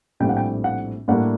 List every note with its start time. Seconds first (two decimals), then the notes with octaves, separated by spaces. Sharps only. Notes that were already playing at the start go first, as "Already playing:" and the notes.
0.20 A#1 A2 G3 C4 G5
0.29 F#5
0.37 G5
0.64 F#5
1.08 A2 G3 A#3 D4 F#5